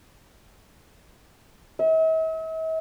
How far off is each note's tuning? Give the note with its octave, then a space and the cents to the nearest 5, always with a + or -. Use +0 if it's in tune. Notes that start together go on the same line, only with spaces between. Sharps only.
E5 -45